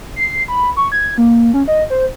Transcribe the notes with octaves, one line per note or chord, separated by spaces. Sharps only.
C7
B5
C#6
G#6
A#3
C#4
D#5
C5